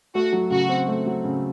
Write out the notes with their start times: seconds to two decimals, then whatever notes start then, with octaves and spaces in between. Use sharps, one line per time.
0.15 A3 F#4
0.33 F#3
0.50 C#3 F#4
0.69 C4
0.88 A3
1.06 F#3
1.24 C#3